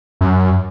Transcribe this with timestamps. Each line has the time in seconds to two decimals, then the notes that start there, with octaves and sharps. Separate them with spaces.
0.21 F#2